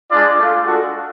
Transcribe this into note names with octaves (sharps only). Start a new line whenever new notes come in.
G#3 D4 F4 D5
A3 F4
G#3 D4 F#4 A4